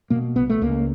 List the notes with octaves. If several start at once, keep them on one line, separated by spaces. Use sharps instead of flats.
B2 A#3
C2 B3
A3
C#2 A#3